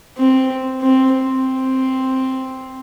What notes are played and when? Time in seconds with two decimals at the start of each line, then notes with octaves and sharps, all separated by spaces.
0.18 C4
0.82 C4
1.14 C4